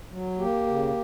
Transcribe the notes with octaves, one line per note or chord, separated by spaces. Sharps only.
F#3
A#3 G4
C#3